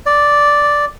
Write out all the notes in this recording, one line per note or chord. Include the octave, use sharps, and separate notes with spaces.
D5